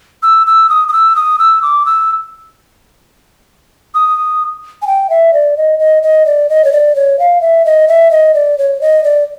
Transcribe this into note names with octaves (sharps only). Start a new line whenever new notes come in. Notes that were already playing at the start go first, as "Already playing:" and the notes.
E6
E6
D#6
D#6
E6
D#6
E6
D6
E6
D#6
G#5
G5
E5
D5
D#5
D#5
D#5
D5
D#5
C#5
D5
C#5
F5
E5
D#5
E5
D#5
D5
C#5
D#5
D5